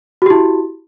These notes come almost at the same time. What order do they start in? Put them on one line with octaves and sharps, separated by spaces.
F#4 G4 E4